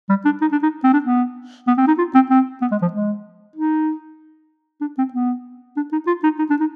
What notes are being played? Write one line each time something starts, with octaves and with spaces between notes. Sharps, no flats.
G3
D4
D#4
D4
D#4
C4
D4
B3
B3
C4
D#4
F4
C4
C4
B3
G#3
F3
G#3
D#4
D4
C4
B3
D4
D#4
F4
D#4
D#4
D4
D#4